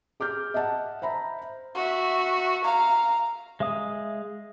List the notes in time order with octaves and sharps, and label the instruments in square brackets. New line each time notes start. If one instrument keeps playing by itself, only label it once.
[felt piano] G#4 D6 F6 G6
D#5 E5 F#5 A5
C5 E5 A#5 B5
[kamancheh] F#4 E5
F5 A#5
[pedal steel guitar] G#3 E5 F5 D#6